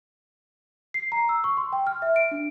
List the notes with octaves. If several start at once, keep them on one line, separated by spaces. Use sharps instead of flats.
C7
A#5
E6
C#6
C6
G5
F6
E5
D7
D4